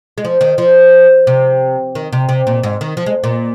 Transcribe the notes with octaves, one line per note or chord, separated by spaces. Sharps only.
G#3
F3
D#3
F3
C3
D#3
C3
C3
A#2
G#2
D#3
F3
G#3
A#2